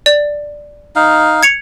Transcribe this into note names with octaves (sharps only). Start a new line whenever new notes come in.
D5
D#4 F5
G#6 C#7 F7